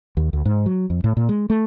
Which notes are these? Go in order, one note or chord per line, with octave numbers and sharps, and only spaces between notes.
D#2
D2
G#2
F#3
F2
A2
A#2
G#3
A3